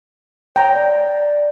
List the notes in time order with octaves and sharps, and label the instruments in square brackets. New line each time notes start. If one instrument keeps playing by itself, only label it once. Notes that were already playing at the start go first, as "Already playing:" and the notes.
[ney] C#5 [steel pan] G5 A#5
[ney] D5